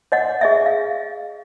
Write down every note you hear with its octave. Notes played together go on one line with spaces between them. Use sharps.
C#5 D#5 F#5
G#4 D#5 E5
F5